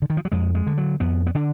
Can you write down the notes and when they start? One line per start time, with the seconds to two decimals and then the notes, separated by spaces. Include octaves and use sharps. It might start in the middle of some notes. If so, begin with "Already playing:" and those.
0.02 D3
0.10 D#3
0.17 F3
0.25 F#3
0.32 F2 G#3
0.55 G#3
0.67 D3
0.78 F#3
1.00 F2 B3
1.27 B3
1.35 D3 D4